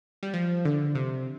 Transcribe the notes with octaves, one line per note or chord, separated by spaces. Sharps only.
G3
F3
D3
C3